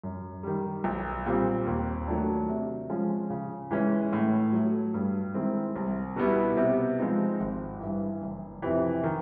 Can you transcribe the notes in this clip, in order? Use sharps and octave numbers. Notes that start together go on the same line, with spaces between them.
F#2
D#3 G3
B1
A#2 G3 C4
D#2
D#3 F#3 A3 D4
C3
F3 G#3 C#4
C#3
E3 G#3 C#4
A2
F#3 A3
G2
D#3 G#3 C4 E4
C2
B2 G3 B3 E4
C3
F3 G#3 C4 D#4
G#1
G2 E3
F#1
F2 C3 E3
D#3